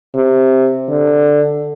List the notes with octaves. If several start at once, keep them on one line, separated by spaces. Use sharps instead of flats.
C3
D3